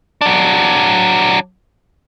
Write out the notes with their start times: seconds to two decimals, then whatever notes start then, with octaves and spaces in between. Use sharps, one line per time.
0.21 F#3 D4